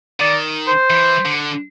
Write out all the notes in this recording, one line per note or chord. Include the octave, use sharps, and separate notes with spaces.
D#3 D5
C5
E3
D3